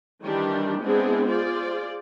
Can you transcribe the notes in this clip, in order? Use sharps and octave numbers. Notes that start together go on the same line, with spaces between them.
D#3 E3 G3 D4 G4
G#3 B3 C4 D4 E4 G#4
F4 G#4 C5 D5